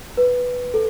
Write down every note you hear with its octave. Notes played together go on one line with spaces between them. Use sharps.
B4
A4